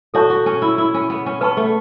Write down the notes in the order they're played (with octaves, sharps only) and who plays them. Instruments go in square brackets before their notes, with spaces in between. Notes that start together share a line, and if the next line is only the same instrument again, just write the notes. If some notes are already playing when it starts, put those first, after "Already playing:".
[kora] F#4 [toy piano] A4 C#5 A5 C#6
[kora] F#4
C#4
E4
E4
C#4
B3
C#4
[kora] B3 [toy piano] B4 A5 C#6
[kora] A3